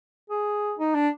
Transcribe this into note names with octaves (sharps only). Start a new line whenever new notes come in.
G#4
D#4
D4